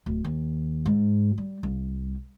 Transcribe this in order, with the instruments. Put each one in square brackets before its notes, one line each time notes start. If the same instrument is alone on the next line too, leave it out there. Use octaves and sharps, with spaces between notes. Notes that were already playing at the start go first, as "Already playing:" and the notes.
[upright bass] D1
D#2
G#2
G3
C2